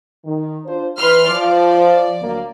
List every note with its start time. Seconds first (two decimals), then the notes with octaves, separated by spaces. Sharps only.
0.25 D#3
0.64 D4 F4 C5
0.98 E3 B4 C6 F6
1.29 F3 D5
2.20 D2 F#3 A#3